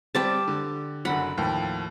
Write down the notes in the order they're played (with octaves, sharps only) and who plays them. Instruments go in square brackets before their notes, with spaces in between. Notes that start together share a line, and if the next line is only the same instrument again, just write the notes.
[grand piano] G3 C4 [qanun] G4 D5 A5
[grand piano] D3
[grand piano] F#1 D3 F#3 [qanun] F#5 B5
[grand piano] D#2 A2 F3